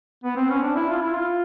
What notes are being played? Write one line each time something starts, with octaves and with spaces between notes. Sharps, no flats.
B3
C4
C#4
D4
E4
F4
E4
F4